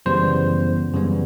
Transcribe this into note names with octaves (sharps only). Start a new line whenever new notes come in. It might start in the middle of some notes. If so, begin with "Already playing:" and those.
F#2 C#3 E3 G3 B3 C5
F#2 C#3 E3 G3 B3